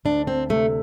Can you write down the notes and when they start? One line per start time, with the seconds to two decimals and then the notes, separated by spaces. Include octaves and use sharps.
0.05 D2 D4
0.27 C4
0.49 C3 A3